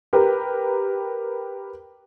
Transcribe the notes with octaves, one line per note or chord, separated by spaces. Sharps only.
G4 A#4 B4